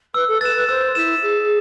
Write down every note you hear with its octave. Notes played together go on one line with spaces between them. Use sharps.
B4 E6
A4
B4 A6 E7
B4
C5 E6
E4 B6 E7
G#4 E6